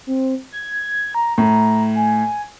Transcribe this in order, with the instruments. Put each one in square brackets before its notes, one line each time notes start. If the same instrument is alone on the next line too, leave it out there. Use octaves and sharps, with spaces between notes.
[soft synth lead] C4
G#6
A#5
[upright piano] A2 [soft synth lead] A#5
[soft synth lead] G#5